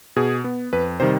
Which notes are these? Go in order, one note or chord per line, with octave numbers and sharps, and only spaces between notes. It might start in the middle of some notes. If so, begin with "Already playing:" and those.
B2 G#4
B3
F2 B4
C3 D#3 G3 C5